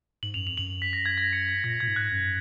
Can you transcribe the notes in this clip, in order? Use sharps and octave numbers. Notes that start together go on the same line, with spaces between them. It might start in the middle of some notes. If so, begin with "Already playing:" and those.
G#2 F#7
F#2 F7
F2 F7
F#2 F#7
B6
A#6
G#6
A#6
C#7
B6
A#2 A#6
A#2 G#6
G#2
F#6
F#2